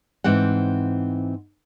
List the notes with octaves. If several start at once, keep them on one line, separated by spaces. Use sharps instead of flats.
G#2 E3 C4 F#5